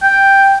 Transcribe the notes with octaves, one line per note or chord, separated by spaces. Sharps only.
G5